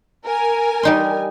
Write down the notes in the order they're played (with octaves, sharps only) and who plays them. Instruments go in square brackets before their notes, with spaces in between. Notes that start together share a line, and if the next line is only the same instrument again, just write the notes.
[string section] A#4 G#5
[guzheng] G3 D#4 C6